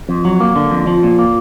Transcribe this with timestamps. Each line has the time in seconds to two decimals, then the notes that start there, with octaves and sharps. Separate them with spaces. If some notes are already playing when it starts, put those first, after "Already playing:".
0.09 F2
0.25 F#3
0.40 A#3
0.56 D3
0.71 F2
0.87 F3
1.03 A#2
1.19 A#3